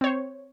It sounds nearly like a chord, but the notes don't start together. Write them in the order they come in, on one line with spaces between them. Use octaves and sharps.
C4 C#5 C5